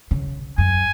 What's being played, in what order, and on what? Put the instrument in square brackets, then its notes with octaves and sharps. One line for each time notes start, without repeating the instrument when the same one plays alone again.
[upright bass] C#3
[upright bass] F#2 [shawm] G#5